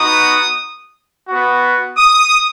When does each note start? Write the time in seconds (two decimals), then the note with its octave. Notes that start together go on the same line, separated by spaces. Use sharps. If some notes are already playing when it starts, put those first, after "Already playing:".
Already playing: B3 D#4 F#4 D#6
1.28 B3 F#4
1.98 D#6